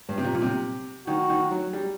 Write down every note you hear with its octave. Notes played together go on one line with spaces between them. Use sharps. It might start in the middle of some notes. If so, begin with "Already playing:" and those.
G2
C3
A#2
A#2
C3
D#3 F#4
D#3
F#3
G3